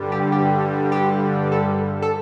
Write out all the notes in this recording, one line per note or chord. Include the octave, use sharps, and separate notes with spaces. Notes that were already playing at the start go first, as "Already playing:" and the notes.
Already playing: G2 D3 G3
G4
G4
G4
A4
A4